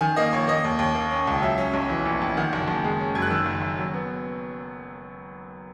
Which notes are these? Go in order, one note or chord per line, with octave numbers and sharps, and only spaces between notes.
D#3 G#5
A#3 D#5
A#1 C#5
A#3 D#5
D#2
D#2
A#3
C#4
C#2
F#3 E5
C#4
B1
E3
A#1
A#1
D#3 F#5
F#1
F#1
G#3
C#4
F#2 G#6
F#6
D#3 E6
F#1
F#1
F#3
B3